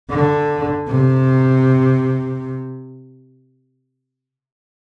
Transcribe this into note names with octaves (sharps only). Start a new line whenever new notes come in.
D3
C3